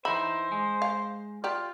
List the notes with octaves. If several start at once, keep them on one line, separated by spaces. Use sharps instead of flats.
E3 D#4 C5 E5 B5
G#3
F5
F4 G4 D5